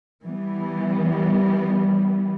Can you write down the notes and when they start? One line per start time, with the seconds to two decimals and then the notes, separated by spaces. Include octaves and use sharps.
0.25 E3 G3 B3